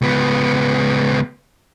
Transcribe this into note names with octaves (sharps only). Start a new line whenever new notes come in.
C#2 B3